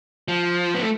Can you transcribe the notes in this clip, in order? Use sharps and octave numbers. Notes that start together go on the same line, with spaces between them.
F3
B3
A3